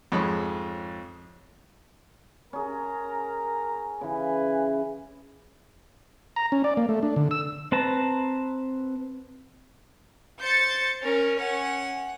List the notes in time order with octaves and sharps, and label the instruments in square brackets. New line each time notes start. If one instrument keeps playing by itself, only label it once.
[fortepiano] F2 G#2 G#3 C#5 B5 C#6
[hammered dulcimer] C#4 G#4 [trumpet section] A#4 A#5
[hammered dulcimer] C#3 E3 [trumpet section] B4 G#5
[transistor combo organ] A#5
C#4
D5
A#3
A3
D4
D3
E6
[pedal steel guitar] C4 B4 A5 A#5
[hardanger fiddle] C5 [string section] G6 A6 C#7
[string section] C#4 [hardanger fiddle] A#4
[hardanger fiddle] F#5